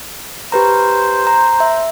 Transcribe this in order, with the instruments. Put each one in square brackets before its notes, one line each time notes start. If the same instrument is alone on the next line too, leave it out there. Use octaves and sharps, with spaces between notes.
[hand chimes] G4 B4 A#5 [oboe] C5
[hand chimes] A#5
E5